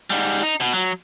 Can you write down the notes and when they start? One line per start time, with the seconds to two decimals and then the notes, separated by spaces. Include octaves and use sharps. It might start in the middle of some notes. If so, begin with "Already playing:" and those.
0.10 G#2 G3
0.43 D#4
0.61 B2
0.73 F#3